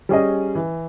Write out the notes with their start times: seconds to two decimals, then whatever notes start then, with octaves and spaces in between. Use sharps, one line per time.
0.09 G3 C#4 G#4 D#5
0.55 E3